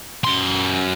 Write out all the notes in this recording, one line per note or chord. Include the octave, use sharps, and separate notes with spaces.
F#2 C6